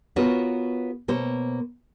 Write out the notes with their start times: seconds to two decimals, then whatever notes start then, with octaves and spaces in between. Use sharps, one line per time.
0.16 B3 F4 F#4 A#4 C#5
1.08 B2 A#3 C5 C#5